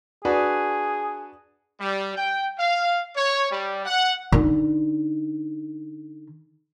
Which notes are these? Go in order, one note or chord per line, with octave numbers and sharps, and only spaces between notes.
D4 F#4 G#4 B4
G3
G5
F5
C#5
G3
F#5
D3 D#4